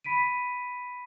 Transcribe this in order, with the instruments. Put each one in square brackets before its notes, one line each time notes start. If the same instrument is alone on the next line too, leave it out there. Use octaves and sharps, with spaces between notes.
[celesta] B5 B6 D7 D#7